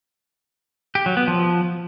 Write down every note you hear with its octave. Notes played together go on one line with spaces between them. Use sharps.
G4
F#3
B3
F3